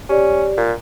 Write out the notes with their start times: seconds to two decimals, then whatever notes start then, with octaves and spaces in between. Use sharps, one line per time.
0.09 C#4 G4 D5
0.57 A#2